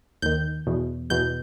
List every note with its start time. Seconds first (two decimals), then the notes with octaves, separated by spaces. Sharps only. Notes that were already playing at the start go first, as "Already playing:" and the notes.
0.22 D#2 D#3 G6
0.67 E2 B2
1.10 E2 B2 G6